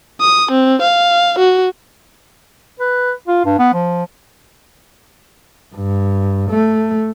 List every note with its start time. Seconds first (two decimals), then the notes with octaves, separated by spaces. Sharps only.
0.21 D#6
0.51 C4
0.81 F5
1.38 F#4
2.80 B4
3.27 F4
3.45 G2
3.59 B3
3.74 F3
5.75 G2
6.50 A3